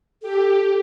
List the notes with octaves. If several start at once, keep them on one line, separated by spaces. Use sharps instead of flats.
G4 A4